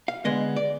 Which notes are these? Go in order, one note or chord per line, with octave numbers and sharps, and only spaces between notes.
F5
D3 G#3 B3 D#5
D5